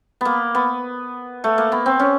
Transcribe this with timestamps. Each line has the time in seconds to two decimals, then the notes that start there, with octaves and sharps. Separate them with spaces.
0.21 A#3 B3
0.55 B3
1.44 A3
1.58 A#3
1.72 B3
1.86 C4
2.00 C#4